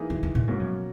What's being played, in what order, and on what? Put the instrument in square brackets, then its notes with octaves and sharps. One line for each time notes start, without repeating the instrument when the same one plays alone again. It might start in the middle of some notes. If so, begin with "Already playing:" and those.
Already playing: [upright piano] E3 A#3 D#4 G#4
[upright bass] D#3
D#3
A#2
[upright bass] G#2 [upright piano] B2 A#3 C#4
[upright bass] F#2